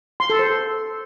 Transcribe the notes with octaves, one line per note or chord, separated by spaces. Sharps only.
C6
A4
C5